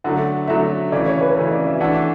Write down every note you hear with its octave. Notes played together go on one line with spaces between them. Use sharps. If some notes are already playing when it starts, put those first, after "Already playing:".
D3 F#3 A3 F#5
D3 F#3 A3 E5
C#3 E3 A3 D5
C#5
B4
C#3 E3 A3
D5
E5
E3 A3 D4 A4 F#5